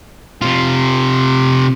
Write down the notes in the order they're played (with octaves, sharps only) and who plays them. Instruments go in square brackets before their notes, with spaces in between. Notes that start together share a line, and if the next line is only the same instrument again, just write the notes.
[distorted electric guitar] C3 F4